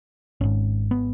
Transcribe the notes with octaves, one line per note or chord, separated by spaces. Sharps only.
G#1 G#2 C#4
B3